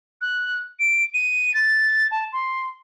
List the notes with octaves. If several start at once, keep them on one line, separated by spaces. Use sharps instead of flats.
F#6
D7
D#7
A6
A5
C6